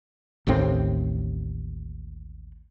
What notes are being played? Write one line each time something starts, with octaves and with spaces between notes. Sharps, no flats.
A1 D#2 A2 C4